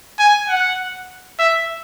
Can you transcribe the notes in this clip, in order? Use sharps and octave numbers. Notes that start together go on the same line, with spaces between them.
G#5
F#5
E5